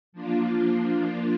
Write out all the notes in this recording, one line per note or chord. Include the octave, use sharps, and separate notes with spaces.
F3 A#3 D4 F4